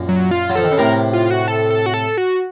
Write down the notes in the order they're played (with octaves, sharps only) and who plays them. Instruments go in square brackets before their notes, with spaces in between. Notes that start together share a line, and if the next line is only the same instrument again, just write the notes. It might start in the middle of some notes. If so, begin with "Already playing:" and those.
Already playing: [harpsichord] F#2 A#2
[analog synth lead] F#3
F4
[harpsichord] F#3
[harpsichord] F3 [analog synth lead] A4
[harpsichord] D#3
C#3
[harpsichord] A2 C3 [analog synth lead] A#4
[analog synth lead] F4
F#4
A4
A4
F#4
A4
F#4